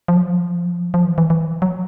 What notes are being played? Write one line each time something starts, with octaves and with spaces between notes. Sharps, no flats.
F3
F#3
F3
F3
E3
E3
E3
F#3